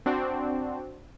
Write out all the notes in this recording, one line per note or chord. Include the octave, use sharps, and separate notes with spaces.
C4 D4 F#4